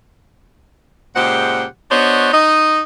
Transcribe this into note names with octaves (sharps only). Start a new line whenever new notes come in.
A#2 C#3 G#3 G4 C5 F#5
B3 D4 F#4 C5 C#5 D#5
D#4 D#5